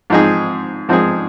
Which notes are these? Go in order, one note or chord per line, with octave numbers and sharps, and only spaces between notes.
G#2 F3 C4 D#4 G#4
G#2 F3 C4 D#4 G#4